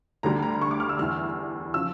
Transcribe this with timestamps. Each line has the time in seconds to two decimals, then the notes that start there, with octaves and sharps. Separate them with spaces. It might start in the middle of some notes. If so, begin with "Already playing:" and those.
0.23 D2 D3 G3 A#5
0.43 A#5
0.61 C#6
0.71 D6
0.80 F6
0.89 E6
0.98 E2 E3 G3 F6
1.74 C#3 F3 E6